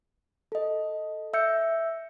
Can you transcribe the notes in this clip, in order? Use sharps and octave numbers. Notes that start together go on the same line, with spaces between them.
A4 D#5
E5 E6 G6 C#7